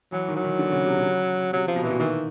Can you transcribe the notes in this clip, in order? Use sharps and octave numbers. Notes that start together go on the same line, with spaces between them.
E3 F#3
D#3
F#3
D#3
D3
C#3
C3
C#3
C3 F#3
F3
B2
A#2 E3
B2
D#3 E3